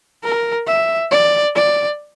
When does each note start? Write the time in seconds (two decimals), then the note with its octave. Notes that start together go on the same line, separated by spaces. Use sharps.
0.23 A#4
0.67 E5
1.11 D5
1.55 D5